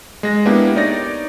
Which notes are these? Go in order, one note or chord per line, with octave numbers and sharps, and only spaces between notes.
G#3 A#6
A#3 B3 D4 E4 G4
D#4 C#5 D5 A#6